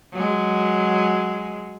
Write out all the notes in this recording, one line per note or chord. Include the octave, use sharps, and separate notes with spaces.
F#3 G#3